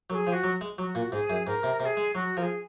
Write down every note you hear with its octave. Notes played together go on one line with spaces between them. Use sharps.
F#3 A#4
G#4
F3
F#4
F#3
G#3
F#3 F#4
A#2
G#2 G#4
F#2
G#2 A#4
C3
C3 A#4
G#4
G#3
F#3 F#4
F3 A#4
G#4